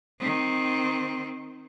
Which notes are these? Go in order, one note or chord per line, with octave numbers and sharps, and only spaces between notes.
D#3 C4